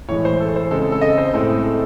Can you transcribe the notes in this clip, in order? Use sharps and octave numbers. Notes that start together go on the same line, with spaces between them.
A2 E3 G#3 C#5
C5
A4
C5
C#3 G#3 C4 A4
A4
A4
D#5
C5
A2 G#3 C4 A4
A4